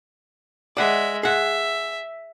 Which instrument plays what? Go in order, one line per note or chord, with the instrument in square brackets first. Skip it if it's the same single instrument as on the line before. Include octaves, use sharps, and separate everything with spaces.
[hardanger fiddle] G#3 E5 [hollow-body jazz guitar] D5 F#5
[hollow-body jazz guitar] G#4 F#5 [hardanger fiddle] E5